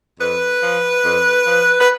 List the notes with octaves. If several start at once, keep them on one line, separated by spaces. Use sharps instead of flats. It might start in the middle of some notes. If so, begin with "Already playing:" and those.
F2 B4
F3
F2
F3
B4